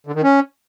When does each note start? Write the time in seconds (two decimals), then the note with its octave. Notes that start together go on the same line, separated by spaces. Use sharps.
0.07 D3
0.15 D#3
0.23 C#4